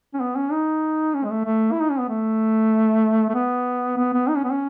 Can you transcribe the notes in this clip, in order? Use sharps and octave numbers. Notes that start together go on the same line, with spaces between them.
C#4
B3
C#4
D#4
C#4
G#3
A3
A3
E4
D#4
C#4
B3
A3
A3
B3
B3
B3
D#4
C#4
B3
C#4